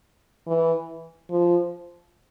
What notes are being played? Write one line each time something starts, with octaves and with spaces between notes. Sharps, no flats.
E3
F3